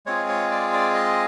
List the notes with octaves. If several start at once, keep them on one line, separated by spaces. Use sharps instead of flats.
G#3 C4 F4 G#4 C#5
C#5
D5
D5
D#5